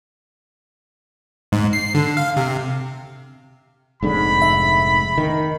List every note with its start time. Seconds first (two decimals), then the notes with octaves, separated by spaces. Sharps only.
1.52 G#2
1.73 C7
1.95 D3
2.17 F5
2.37 C3
4.03 F1 G#2 D3 B5
4.42 E5
5.18 D#3